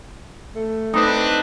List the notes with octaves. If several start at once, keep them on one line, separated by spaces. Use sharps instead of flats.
A3
C4 D4 D#4 B4